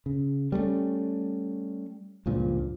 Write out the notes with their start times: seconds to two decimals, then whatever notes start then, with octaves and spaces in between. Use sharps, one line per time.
0.06 C#3
0.52 G3 A3 B3 C#4
2.26 C#2 G2 A#2 F3